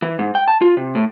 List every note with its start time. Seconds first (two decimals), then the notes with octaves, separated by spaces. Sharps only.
0.02 E3
0.19 G#2
0.35 G5
0.48 A5
0.62 F4
0.77 C3
0.95 A2